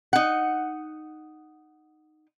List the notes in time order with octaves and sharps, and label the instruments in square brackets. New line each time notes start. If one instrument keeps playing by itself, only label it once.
[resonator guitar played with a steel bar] D#4 F#5